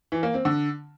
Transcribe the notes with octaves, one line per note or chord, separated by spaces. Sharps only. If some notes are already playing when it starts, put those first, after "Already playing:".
E3
A#3
C4
D3